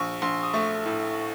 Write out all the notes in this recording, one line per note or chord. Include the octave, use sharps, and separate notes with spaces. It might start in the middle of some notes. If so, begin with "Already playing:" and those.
Already playing: A#1 C#6
A#1 C6
D#6
A3 C#6
A2